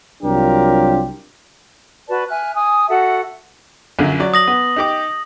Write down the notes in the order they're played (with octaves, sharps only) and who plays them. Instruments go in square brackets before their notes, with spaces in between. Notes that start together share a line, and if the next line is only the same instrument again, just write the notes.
[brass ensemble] C2 F#3 D4 F4 G4 A#4
[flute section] F#4 B4 D5 A5
E5 G#5 F6 F#6
G#5 D#6
F#4 A4 E5 F#5
[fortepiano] A#1 F#2 D3
F#3 D5
[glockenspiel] D#6 A#6 F#7
[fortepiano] B3
D#4 G4 D6